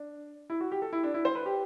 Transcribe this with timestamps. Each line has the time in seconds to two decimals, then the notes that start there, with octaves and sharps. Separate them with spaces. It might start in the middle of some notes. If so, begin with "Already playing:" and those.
Already playing: D4
0.50 E4
0.60 F#4
0.72 G4
0.82 A4
0.93 E4
1.03 D4
1.14 E4
1.25 C5
1.35 B4
1.46 G4